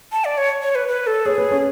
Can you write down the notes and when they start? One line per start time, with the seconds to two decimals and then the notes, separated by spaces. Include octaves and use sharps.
0.12 A5
0.25 D5
0.38 C#5
0.63 C#5
0.75 B4
0.88 B4
1.07 A4
1.26 G#4 C#5
1.38 B4
1.51 C#4